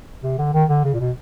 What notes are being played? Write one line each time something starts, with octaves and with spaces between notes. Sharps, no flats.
C3
D3
D#3
D3
C#3
A#2
B2